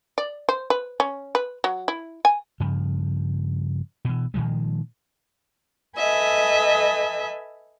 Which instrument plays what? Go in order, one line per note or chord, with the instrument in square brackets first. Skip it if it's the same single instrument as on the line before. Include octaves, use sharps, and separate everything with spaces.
[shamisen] D5
C5
B4
C#4
B4
F#3
E4
G#5
[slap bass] G2 C#3 F3
B2 E3
A#2 D#3 F3 G#3
[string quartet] A4 B4 D#5 E5 G#5